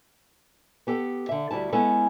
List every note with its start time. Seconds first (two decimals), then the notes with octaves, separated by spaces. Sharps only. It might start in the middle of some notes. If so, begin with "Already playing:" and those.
0.87 B3 G4 A4
1.29 D3 E5
1.51 D2 G3 E4 A5
1.72 G#3 B3 C#4 E4 A4